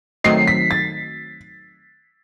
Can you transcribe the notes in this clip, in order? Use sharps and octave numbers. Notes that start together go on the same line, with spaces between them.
D#3 F#3 A3 C4 D#4 C7
B6
A6